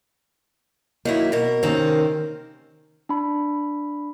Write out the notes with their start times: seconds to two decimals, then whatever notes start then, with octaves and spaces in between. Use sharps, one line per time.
1.05 D#3 F#3 A#3 E4
1.32 B2 A#4
1.63 C3 D#3 A#3 C4 C#4
3.09 D4 B5